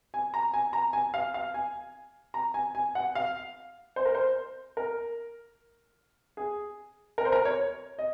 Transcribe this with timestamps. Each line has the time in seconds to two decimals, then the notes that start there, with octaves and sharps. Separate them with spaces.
0.14 G#5
0.34 A#5
0.54 G#5
0.73 A#5
0.93 G#5
1.14 F5
1.34 F5
1.54 G#5
2.34 A#5
2.54 G#5
2.75 G#5
2.95 F#5
3.15 F5
3.96 C5
4.05 A#4
4.15 C5
4.77 A#4
6.37 G#4
7.18 A#4
7.25 C5
7.32 A#4
7.45 C#5
7.99 D#5